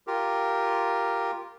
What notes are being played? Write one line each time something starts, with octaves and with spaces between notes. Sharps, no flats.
F4 G4 A#4